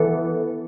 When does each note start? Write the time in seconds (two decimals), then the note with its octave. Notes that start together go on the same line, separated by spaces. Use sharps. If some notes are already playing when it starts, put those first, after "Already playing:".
Already playing: E3 B3 A4